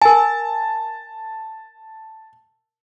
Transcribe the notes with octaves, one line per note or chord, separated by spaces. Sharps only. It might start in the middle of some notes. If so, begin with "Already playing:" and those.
A#4 G#5 A5